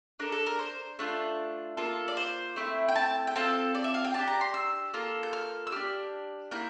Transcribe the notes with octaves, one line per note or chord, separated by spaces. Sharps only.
D4 A4 A#4
A4
A#4
C5
A3 D4 F4
A#3 F4 A4
D5
C5
A3 C4 E4
G5
A5
G5
C4 F4 A4 A5
D5
E5
F5
G5
D4 G4 A5
A#5
C6
E6
A#3 F4 A4
G6
F6
E6
D4 G4 F6
A#3 E4 G6